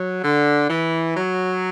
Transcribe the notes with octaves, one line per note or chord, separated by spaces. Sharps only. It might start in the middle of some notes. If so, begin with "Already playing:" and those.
Already playing: F#3
D3
E3
F#3